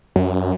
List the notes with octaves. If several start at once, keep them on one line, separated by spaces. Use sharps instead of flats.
F#2